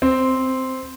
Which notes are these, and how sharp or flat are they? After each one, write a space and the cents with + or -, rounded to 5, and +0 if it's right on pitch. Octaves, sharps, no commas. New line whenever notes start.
C4 -5